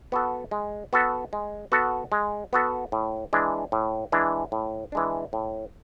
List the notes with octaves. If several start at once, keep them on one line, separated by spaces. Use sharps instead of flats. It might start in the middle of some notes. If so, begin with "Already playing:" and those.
B3 F#4 A4
G#3
B3 F#4 A4
G#3
B3 F#4 A4
G#3
B3 F#4 A4
A2
E3 G#3 D4
A2
E3 G#3 D4
A2
E3 G#3 D4
A2